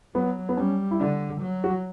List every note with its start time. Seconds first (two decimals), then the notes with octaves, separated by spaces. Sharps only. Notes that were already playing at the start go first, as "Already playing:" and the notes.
0.15 F#3 B3
0.49 B3
0.57 G3 C#4
0.91 E4
1.00 D3 D4
1.42 F#3
1.64 F#4